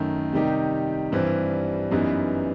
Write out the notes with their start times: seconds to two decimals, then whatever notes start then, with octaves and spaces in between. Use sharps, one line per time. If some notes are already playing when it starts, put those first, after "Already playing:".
Already playing: F#2 D#3 A3
0.33 C3 D#3 G3 D#4 G4
1.12 G2 E3 G3 C4
1.91 F#2 E3 G3 B3 D#4